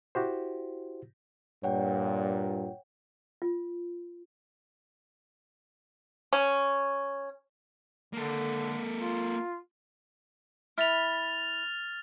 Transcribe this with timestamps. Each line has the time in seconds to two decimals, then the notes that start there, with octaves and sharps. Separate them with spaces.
0.15 E4 F#4 G4 C5
1.64 G2 A#2 C#5 F#5 G5
3.42 F4
6.33 C#4
8.13 D3 A#3 A4
8.98 F4
10.78 E4 B5 F6 A6 F7